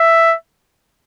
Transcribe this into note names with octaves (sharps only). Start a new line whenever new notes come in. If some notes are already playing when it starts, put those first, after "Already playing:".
Already playing: E5